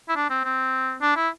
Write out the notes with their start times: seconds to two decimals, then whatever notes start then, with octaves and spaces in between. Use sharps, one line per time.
0.09 E4
0.16 D4
0.30 C4
0.44 C4
1.02 D4
1.16 E4